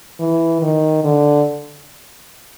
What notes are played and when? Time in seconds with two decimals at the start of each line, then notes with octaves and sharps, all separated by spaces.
0.19 E3
0.62 D#3
1.04 D3